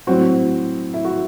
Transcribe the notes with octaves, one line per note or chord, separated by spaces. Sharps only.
A2 F#3 C4 F#4
E4
F#4